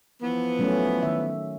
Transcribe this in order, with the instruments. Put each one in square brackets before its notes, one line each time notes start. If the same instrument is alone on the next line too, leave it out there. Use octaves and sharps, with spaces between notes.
[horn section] E3 F3 B3
[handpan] F#3 A3 C#4
D#3 E5